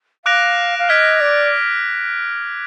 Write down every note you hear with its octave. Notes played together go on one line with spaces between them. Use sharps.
F5 D6 F#6 A#6 D7 F7
F5
D#5 F6 G#6 B6 D7
D5